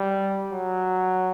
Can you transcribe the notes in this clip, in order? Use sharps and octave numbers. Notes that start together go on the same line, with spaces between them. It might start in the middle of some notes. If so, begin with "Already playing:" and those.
Already playing: G3
F#3